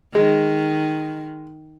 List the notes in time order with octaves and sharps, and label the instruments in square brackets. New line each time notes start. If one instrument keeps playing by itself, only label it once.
[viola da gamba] D#3 [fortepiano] G#3